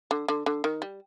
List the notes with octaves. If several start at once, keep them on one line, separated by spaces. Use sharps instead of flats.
D3
D3
D3
D#3
G3